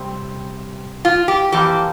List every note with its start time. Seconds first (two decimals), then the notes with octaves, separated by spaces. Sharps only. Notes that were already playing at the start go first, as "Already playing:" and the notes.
Already playing: C3 G3 C4
1.05 F4
1.28 G4
1.52 F2 E3 A#3 G4